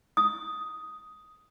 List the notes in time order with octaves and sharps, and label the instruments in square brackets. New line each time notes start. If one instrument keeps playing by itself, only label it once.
[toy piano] D#6